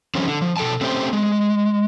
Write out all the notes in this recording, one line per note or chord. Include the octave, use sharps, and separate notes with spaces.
D3 F3 G3 C4 C#4
D3
F3
B2 A4 G5 A5
A3 C4 C#4 G4 C5 G5
G#3